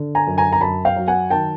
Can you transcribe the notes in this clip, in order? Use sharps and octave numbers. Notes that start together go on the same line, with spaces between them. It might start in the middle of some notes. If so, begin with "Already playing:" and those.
Already playing: D3
G#5 A#5
F#2
G#5 A#5
A#5
F#2 A5 B5
F5 G5
F#3
F#5 G#5
D#3 G5 A5